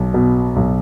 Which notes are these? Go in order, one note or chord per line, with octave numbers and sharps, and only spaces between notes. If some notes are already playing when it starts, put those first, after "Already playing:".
Already playing: B1
B2
B1